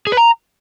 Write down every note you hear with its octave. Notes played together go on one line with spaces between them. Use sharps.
G#4
B4
A#5